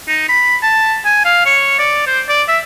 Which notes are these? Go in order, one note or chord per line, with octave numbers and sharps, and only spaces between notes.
D#4
B5
A5
G#5
F5
C#5
D5
C5
D5
E5